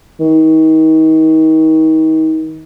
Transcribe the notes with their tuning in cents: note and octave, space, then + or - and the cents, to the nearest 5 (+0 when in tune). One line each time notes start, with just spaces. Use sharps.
D#3 +35